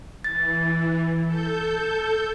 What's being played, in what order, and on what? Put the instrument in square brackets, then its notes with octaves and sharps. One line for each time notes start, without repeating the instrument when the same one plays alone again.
[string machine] E3 [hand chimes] A6
[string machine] A4 G6